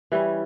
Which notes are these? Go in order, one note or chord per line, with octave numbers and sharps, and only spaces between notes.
E3 G3 C#4